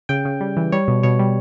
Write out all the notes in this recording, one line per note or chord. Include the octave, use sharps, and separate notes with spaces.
C#3 G5
C#3
G3
E3
G3 C#5
B2
B2 C#5
G3